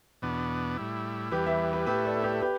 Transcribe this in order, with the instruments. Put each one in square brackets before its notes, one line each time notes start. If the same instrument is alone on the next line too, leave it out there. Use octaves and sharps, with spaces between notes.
[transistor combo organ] E2 B2 B3 D4
A2 G3 E4
[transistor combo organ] E2 E3 G3 [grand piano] G4 B4
[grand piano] B4 E5
G4 B4
[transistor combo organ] A2 A3 E4 [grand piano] G4 B4
[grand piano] A4 D5
G4 B4
G4 B4